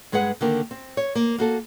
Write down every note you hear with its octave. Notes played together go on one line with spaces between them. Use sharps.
G2 G#3 G#4 B4 F#5
D3 D#3 A#3 A#4
C4
C#5
A#3
A#3 F#4 A4